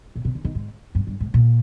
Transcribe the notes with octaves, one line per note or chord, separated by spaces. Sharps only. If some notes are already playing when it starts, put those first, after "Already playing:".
A#2
C3
D3
D#3
G#2
G2
G2
G#2
A#2